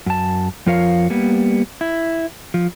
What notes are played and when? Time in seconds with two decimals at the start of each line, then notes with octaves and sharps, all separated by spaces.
0.06 F#2 A5
0.66 F2 F3 F4 A#4 C#5 F5
1.10 G3 A#3 B3
1.81 E4
2.54 F3